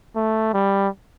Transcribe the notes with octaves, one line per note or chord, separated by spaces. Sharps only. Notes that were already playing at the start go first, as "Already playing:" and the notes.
A3
G3